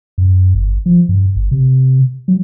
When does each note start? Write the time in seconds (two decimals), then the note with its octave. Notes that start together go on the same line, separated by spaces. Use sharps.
0.18 F#2
0.55 G1
0.86 F3
1.09 G2
1.36 G1
1.51 C3
2.28 F#3